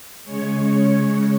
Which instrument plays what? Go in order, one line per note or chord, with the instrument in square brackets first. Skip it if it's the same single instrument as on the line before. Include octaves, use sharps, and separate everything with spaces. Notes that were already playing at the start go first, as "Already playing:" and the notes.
[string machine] C#3 G#3 C#5